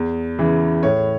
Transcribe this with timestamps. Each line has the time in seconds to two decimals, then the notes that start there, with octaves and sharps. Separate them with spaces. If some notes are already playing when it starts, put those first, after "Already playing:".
Already playing: E2
0.39 C#3 E3
0.83 A2 C#5